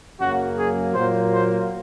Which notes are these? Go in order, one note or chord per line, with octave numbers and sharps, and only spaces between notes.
F#2 C#3 F#3 A#3 F#4
G#4
A#2 F#3 A#3 C5
C5